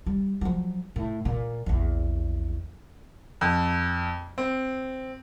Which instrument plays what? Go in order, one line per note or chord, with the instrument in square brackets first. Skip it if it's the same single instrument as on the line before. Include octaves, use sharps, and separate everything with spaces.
[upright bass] G3
F3 F#3
A2
A#2
A#1 E2
[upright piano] F2
C4